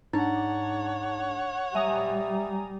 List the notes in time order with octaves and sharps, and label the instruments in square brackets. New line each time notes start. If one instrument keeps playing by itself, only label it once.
[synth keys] G#2 D4 [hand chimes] D#4 A#5 A6 [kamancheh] C#5 F#5
[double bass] G3 [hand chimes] E5 [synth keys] G#5 A#5 D#6